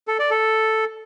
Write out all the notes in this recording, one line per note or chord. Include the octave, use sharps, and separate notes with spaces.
A4
D5
A4